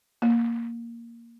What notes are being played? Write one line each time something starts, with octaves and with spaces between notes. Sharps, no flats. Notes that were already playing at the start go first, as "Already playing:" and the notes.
A#3